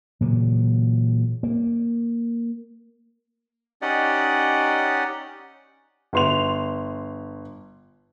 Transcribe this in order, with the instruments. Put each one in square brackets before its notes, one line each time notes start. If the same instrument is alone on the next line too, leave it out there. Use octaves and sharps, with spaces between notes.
[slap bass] A#2 C#3 E3 F#3
A#3
[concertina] C#4 D#4 G4 D5 D#5 F#5
[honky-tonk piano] G1 C6 F7